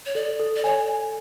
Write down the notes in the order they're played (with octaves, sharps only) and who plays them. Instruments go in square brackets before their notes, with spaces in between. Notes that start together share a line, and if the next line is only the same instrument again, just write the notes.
[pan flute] C#5
[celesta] A4 [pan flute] D5
[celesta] A4
[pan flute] D5
[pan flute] C#5 [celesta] G#5
[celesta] G#5